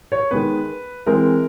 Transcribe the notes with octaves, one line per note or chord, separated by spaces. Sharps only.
C#5
D#3 G#3 B3 B4
E3 G#3 C4 A#4